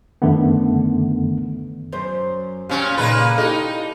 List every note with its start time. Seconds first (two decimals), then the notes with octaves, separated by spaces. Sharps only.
0.22 F#2 D3 D#3 A3 B3
1.92 F#2 C5
2.69 A#2 G3 C#4
2.97 A#2 C#3 A#3 D#4 B4
3.38 D#4 E4 G4 A4